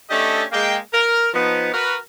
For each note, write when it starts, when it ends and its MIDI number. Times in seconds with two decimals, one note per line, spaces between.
0.10 0.44 57
0.10 0.44 61
0.10 0.44 62
0.10 0.44 67
0.10 0.44 69
0.10 0.44 75
0.52 0.77 56
0.52 0.77 58
0.52 0.77 79
0.93 1.29 70
1.34 1.69 53
1.34 1.69 59
1.34 1.69 63
1.73 1.96 66
1.73 1.96 70
1.73 1.96 71